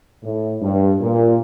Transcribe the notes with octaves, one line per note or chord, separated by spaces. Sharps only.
A2
G2
A#2